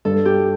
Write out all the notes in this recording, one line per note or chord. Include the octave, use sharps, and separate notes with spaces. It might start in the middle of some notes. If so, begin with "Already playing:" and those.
G2 A4
G4